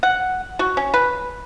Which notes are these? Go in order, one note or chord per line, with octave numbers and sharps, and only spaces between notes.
F#5
F#4
C#4
B4